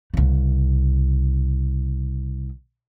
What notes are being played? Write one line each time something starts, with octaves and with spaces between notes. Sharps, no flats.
C2 C#3